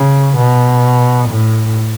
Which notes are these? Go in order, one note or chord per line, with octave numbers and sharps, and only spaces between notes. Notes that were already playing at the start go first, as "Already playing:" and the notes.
Already playing: C#3
B2
A2